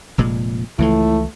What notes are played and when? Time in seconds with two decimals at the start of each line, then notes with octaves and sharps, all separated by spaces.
0.18 F1 A#2 G#3
0.78 C#2 A2 E3 F3 A3